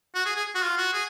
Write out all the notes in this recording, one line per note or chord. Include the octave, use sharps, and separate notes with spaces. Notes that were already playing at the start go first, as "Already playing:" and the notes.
F#4
G#4
G#4
F#4
F4
F#4
G#4